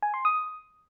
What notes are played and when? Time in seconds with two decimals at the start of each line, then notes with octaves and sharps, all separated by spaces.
0.02 G#5
0.14 C6
0.25 D#6